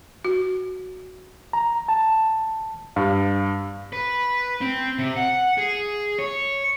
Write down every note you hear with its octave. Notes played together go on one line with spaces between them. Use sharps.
F#4
A#5
A5
G2 F5
B4
C4
C3
F#5
G#4
C#5